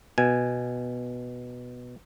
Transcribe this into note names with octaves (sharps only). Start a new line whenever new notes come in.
B2 G#5